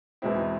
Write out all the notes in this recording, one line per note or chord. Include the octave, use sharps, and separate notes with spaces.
E2 B2 G#3 C4 E4